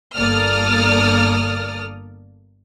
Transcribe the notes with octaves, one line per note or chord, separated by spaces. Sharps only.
G1 A#3 A4 D5 D#6 F6